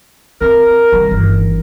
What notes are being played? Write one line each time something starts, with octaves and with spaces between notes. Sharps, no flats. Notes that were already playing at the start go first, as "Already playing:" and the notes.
C4 A#4
D#3 G3
G1 E3